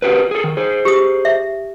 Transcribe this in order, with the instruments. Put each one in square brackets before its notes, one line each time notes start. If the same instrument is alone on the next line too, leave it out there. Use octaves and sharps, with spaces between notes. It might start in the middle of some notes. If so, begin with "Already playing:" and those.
[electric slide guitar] F#4 G4 B4
G#4 A4
D#3
G#4 C5
[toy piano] G4 D#6
E5